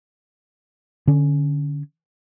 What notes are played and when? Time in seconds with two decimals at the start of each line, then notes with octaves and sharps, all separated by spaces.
1.07 D3 C#4